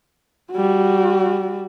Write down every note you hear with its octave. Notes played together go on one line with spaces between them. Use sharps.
G3 F#4